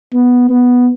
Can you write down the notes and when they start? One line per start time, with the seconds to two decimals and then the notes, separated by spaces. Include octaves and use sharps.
0.14 B3
0.49 B3